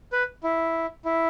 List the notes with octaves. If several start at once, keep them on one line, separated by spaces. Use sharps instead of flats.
B4
E4
E4